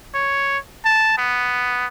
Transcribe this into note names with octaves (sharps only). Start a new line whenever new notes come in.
C#5
A5
B3